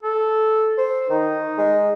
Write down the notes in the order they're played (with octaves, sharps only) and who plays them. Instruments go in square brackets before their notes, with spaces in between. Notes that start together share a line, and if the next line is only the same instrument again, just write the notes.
[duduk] A4
[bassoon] C5
[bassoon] D#3 [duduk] D#4
[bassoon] G#3